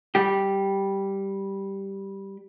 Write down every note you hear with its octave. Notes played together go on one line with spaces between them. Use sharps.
G3 G4